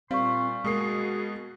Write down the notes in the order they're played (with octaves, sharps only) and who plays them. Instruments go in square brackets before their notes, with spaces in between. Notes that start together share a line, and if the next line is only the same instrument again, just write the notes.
[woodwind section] A#2 C6 [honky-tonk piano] G3 [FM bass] C4 [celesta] F5 C#6
[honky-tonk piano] B2 A#3 C7 [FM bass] G#3 [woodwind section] F#4 G#4